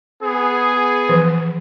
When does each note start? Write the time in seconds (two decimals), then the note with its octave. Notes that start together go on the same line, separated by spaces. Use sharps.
0.22 B3 G#4
1.09 E3 F3